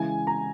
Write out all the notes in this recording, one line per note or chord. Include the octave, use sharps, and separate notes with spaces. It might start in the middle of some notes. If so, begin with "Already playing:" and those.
Already playing: C#3 E3 G#3 E4 G#5
A#5